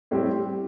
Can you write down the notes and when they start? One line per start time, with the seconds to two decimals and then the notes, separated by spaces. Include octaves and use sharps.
0.11 A2 G3 C4 G4